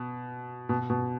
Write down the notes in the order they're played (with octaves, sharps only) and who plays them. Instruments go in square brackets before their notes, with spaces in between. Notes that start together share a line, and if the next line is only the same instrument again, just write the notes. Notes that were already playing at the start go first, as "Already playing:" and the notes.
Already playing: [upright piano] B2
B2
B2